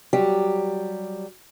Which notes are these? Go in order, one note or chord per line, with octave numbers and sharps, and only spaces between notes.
F#3 G3 G4